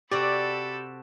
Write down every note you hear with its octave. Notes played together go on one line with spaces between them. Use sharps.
C3 F#4 G4 A4 D5 B5